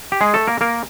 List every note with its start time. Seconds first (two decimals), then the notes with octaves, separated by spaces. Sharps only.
0.12 G4
0.21 G#3 G#4
0.34 A3 A4
0.47 A#3 A#4
0.61 A#3 A#4